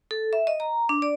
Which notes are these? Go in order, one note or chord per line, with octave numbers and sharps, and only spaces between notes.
A4
E5
D#5
A#5
D4
D5